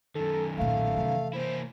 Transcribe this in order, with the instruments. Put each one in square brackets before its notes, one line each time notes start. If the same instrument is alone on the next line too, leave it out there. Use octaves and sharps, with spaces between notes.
[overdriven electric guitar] F#2 D#3 [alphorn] A4
[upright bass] B1 A#2 [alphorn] A3 [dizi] F5
[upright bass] C3 E3
[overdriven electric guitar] A#3 E4 [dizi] C5